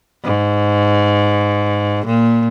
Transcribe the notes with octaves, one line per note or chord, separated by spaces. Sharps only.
G#2
A#2